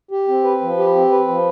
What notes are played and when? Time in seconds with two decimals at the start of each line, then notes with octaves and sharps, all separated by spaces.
0.11 G4
0.28 C4
0.44 B4
0.62 F3
0.78 G4
0.95 C4
1.11 B4
1.28 F3